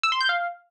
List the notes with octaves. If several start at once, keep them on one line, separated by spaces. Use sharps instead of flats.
E6
C6
G6
F5